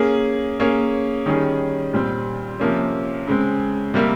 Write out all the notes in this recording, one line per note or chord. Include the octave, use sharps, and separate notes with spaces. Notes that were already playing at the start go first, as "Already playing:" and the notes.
Already playing: A#3 C#4 G#4
A#3 C#4 G#4 C#5
D#3 G3 C#4 G#4
A#2 G3 C4
C3 F3 A#3 C#4
C#3 G#3 C4
C3 G3 A#3